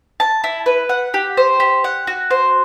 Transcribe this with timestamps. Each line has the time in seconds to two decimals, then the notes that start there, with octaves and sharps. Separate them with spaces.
0.20 A5
0.44 E4
0.66 B4
0.89 F#5
1.14 G4
1.37 C5
1.60 G4
1.84 F#5
2.07 F#4
2.31 C5